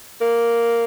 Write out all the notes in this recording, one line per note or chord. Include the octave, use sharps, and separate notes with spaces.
A#3